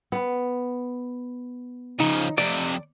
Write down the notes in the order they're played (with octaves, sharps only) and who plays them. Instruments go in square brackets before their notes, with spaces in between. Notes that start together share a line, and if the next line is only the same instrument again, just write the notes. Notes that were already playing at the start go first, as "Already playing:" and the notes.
[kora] B3
[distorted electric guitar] C#3 F3 [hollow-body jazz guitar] D#4
[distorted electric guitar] F2 C3 [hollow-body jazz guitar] D5